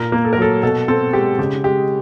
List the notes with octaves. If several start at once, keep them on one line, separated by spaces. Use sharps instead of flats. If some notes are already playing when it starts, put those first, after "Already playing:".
Already playing: A#2 A#4
A#3
A4
A#4
F#3 A4
B2 A4
C4 A4
G#3 G4
C#3 G4
G#3 G4